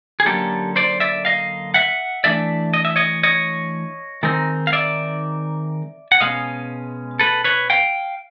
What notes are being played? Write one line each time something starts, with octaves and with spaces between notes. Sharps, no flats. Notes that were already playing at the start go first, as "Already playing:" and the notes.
G#4
D3 F#3 A#3 C#4 G4 A4
C5 D5
D5 E5
D#5 F5
E5 F#5
E3 A3 D4 D5 E5
D#5
E5
C#5 D#5
C#5 D#5
D#3 G#3 C4 D#4
F5
D5 E5
F#5
B2 G#3 C#4 D#5 F5
A4 B4
B4 C#5
F5 G5